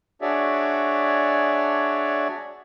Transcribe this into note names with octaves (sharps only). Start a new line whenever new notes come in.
D4 F#4 G#4 C#5 D5 E5